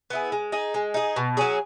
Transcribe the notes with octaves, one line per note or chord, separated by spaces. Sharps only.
B3 E4 G#4
G#3
D#4 G#4
G#3
D#4 G#4
B2
F#3 C#4 G#4